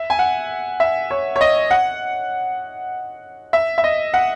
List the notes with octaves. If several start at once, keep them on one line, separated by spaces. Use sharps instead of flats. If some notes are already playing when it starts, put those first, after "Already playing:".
Already playing: E5
G#5
F#5
E5
C#5
C#5
D#5
F#5
E5
E5
D#5
F#5